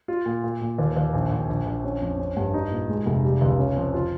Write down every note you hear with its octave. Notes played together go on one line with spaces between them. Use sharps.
F4
A#2
A#2
A#2
D#2
D#2
A#1
A#1
A#1
A#1
C#4
F2
C#4
G2
D#4
A#2
G#3
F1
G3
C#2
C#4
F2
F4